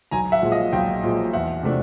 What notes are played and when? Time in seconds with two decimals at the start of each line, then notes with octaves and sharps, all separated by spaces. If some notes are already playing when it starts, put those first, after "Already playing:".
0.11 B1 G#5 A#5
0.32 E5 F#5
0.42 A#2 F3 G#3
0.52 D#5 F5
0.73 B1 F5 G5
1.03 A#2 F3 G#3
1.33 E2 E5 F#5
1.63 C3 F3 A3 D4